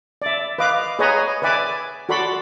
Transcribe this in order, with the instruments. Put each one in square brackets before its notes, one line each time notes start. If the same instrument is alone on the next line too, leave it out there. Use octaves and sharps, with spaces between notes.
[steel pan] D5 E5
B4 D#5 F5 D6
G#4 B4 C#5 D#5 G#5 A#5
B4 D5 E5 G#5 D6
F#4 A4 D5 B5 C6